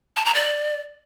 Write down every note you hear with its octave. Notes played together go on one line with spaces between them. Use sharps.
A5
A#5
D5